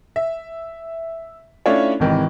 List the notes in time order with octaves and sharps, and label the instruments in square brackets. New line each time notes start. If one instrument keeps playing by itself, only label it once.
[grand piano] E5
A3 C#4 D4 E4 F4 C#5
G#1 C3 D#3 E3